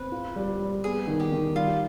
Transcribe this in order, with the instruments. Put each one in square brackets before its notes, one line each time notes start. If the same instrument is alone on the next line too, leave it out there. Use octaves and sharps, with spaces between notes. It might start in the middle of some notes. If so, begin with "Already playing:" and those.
Already playing: [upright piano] C4 [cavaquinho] B4
[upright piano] F4
G3
G3
[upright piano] B3 [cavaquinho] G#4
[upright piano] D#3
[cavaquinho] G4
[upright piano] D#3
[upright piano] G3 [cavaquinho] F4